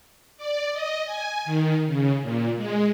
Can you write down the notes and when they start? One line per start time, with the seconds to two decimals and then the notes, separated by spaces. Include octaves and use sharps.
0.37 D5
0.73 D#5
1.05 G#5
1.45 D#3
1.87 C#3
2.22 A#2
2.57 G#3